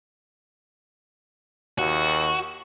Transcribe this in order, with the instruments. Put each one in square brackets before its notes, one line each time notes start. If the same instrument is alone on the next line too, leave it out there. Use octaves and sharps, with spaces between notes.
[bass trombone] D#2 [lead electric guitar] F#4